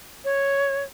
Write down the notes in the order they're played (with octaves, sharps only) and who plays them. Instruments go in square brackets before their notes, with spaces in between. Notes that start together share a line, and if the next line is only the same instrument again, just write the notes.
[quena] C#5